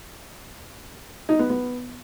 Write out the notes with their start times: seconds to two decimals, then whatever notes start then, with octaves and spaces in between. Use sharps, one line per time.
1.29 D#4
1.39 B3
1.50 B3